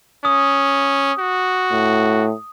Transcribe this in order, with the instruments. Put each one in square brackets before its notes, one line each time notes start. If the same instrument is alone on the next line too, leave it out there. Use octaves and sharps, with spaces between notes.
[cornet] C#4 [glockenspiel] D#6
[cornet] F#4
[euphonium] A2